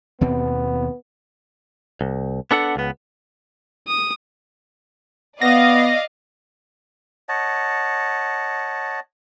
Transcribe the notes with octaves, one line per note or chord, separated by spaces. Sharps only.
D#2 B2 B3 C4
C2
B3 D4 A4 F#5
C#2 B3
D#6
B3 D5 D#5 F5 A#6
C#5 D#5 F#5 A5